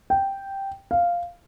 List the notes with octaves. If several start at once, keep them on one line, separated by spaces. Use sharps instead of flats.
G5
F5